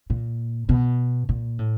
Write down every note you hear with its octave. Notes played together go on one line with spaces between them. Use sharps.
A#2
B2
A#2
A2